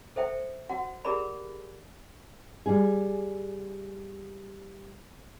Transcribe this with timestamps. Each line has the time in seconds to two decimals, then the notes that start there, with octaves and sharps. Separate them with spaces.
0.16 A4 C5 E5 G5
0.69 F#4 F#5
1.05 G4 G#4 A#4 D5 B5
2.66 G3 G#4